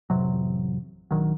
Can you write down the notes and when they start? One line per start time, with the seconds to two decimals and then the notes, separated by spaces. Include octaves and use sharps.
0.10 A1 F2 C3 F#3
1.11 A#1 D#3 F#3